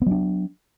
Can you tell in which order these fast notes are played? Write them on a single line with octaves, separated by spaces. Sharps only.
B3 F#3 D4